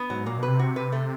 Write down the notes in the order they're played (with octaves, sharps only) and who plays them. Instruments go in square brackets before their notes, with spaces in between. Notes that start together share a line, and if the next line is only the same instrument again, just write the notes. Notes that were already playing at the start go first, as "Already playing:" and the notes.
Already playing: [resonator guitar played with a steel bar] B3
[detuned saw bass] G#2 [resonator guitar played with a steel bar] F#3
[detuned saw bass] A#2 [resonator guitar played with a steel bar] A#3
[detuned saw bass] B2 [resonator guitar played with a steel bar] B4
[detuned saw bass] C3
[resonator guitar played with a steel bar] F#4
B4
A3